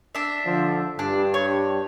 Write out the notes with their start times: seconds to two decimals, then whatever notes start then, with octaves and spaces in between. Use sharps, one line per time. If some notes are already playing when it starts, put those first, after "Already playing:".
0.15 D4 E5
0.46 D3 F3
0.99 G2 D4
1.34 C#5